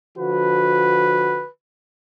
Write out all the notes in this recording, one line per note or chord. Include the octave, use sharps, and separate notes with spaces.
D3 F3 F#4 B4